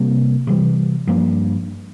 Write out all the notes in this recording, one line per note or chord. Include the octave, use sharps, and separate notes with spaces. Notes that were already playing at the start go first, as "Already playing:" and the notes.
Already playing: C3 G3 A#3
C3 E3 G3
G2 F3 A#3